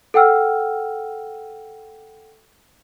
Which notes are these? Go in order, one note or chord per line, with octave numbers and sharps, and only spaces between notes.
A4 F#5 G5 E6 F6